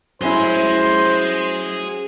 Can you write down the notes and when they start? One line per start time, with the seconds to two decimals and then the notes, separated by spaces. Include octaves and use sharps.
0.22 F#3 C#4 E4 G#4 C5 C6